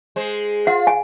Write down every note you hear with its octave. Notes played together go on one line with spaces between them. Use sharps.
G#3 C5
F4 F#5
G#5